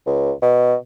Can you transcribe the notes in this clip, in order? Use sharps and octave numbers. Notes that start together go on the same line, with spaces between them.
C#2
B2